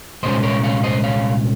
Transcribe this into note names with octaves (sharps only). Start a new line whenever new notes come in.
C2 A#2 G#3 C#4 C5 D#5
A#4 C#5
C#5 F5
C5 D#5
C#5 F5